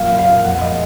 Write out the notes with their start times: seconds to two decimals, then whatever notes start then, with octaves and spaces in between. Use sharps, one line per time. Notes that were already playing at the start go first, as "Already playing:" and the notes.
Already playing: F#2 A#2 F5
0.19 A#2 F5
0.43 F2 F#5
0.62 D#5
0.69 G#3